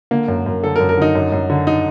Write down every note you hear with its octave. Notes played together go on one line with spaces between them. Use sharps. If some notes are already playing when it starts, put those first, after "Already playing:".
D3 A#3
F#2
F#2
D3 A4
A#4
F#2
A#4
D3 D#4
F#2
F#2
D3
D#4